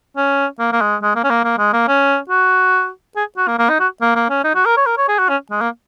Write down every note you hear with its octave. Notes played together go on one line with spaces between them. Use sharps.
C#4
A#3
A#3
G#3
G#3
A#3
C#4
A#3
A#3
G#3
A#3
C#4
F#4
G#4
F#4
A#3
A#3
D#4
F#4
A#3
A#3
C#4
D#4
F#4
A#4
C#5
A#4
C#5
G#4
F#4
C#4
G#3
A#3